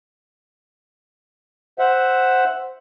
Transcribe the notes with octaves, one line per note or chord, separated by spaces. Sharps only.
C5 E5 F#5